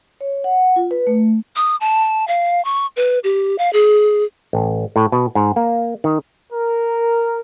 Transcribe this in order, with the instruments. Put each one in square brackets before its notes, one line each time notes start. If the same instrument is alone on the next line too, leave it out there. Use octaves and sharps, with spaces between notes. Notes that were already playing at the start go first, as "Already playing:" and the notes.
[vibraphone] C#5
F#5
F4
B4
A3
[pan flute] D#6
A5
F5
C#6
B4
G4
F5
G#4
[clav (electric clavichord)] A1
A2
B2
G#2
A#3
D#3
[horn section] A#4